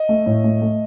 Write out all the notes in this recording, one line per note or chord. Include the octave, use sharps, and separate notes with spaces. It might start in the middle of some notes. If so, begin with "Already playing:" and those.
Already playing: D#5
A3
A2
A3
A3